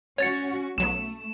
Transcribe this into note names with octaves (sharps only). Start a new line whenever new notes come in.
C#4 F#4 C#5 A6 C#7
B1 F#3 A3 B3 E7